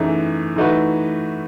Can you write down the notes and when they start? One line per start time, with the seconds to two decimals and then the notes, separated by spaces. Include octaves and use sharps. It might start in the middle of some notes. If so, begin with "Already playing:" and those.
Already playing: F#2 E3 A3 D#4 G#4
0.56 E3 A3 D#4 F#4 B4